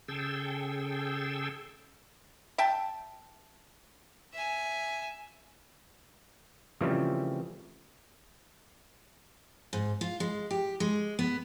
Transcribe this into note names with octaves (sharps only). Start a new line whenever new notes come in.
C#3 G#4 A4 G5 E6
E5 G5 A5
E5 G#5
C#3 E3 F3 G3 A3 C4
G#2
F4
G#3
G4
G#3
B3